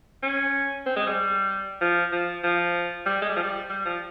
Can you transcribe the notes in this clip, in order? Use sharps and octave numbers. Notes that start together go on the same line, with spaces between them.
C#4
C4
G#3
G3
F3
F3
F3
G3
G#3
G3
F3
G3
G3
F3